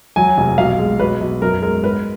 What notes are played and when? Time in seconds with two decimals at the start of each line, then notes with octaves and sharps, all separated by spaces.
0.16 F#3 G#5
0.37 F1
0.58 B1 F5
0.79 G#3
1.00 B1 B4
1.21 B1
1.42 F#2 A#4
1.62 G#3 A#4
1.83 G#2 B4